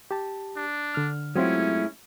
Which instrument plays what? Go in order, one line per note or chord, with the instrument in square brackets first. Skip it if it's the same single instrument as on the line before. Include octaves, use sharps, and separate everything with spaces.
[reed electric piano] G4 A5
[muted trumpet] D4
[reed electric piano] D3 F6
[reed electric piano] F#3 C4 F4 [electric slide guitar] G#3 A3 E4 [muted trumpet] C#4